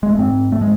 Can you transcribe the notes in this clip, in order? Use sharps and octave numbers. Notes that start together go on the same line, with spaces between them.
G#3
A3
G#2 C4
A3
G#3